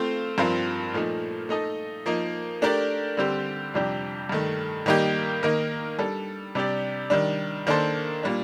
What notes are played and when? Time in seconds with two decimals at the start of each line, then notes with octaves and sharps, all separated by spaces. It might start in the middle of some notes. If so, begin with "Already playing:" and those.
Already playing: A3 C4 F4 C5
0.38 G2 F3 C4 F4 A#4
0.93 A#2 F3 A3 D#4 A#4
1.49 A3 D#4 A4 D#5
2.06 F3 A#3 D#4
2.62 A3 D4 G4 A#4 D5
3.17 D3 G3 C4 G4
3.74 F2 C3 G3 D4 G4
4.29 G2 D#3 A3
4.86 D#3 G3 A#3 D#4 G4
5.43 D#3 A#3 D#4 A#4
5.99 G3 D4 A4
6.55 C3 G3 D4 G4 D5
7.10 D#3 G3 D4
7.67 D#3 A#3 D4 A4 C5
8.23 A#2 G3 A#3 D4